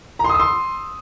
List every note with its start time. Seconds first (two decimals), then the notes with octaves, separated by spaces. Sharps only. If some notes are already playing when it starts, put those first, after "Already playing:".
0.19 A#5
0.24 C6
0.29 D#6
0.34 E6
0.40 C6